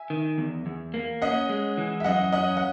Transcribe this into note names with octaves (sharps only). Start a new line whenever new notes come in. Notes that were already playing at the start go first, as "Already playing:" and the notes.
Already playing: E5 G#5
D#3
E2
E2
A#3
C#4 D#5 F#5
G#3
E3
E5
F#2 D#5 F#5
C#4 D#5 F#5
F#5